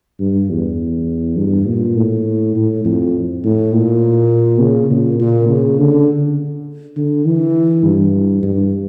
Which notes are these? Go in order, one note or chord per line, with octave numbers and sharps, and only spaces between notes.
G2
E2
G2
A#2
A2
A2
F2
A2
A#2
C#3
A#2
A#2
C#3
D3
D3
E3
G2
G2